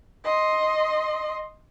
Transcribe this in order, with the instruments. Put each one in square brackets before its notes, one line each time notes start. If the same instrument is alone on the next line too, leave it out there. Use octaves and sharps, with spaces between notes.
[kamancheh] D#5 C6